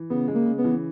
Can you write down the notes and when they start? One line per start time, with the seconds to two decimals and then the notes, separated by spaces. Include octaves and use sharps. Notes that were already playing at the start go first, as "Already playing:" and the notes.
Already playing: E3
0.10 C#3 B3
0.28 G#3
0.35 A#3
0.46 C#3
0.58 B3
0.64 E3